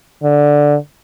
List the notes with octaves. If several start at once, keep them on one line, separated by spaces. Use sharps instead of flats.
D3